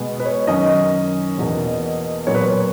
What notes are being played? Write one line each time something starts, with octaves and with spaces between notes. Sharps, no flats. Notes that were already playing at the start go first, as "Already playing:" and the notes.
Already playing: B2 G#3 B3
B4
C#5
F#2 D#3 F#3 C#4 D#5
E2 B2 A#3
A#2 F#3 B3 C#5
B4
C#5